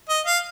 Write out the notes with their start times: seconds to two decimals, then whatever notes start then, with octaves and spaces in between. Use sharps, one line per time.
0.09 D#5
0.26 F5